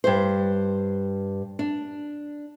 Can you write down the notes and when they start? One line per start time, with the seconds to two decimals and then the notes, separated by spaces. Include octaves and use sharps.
0.04 G2 C5
1.59 D4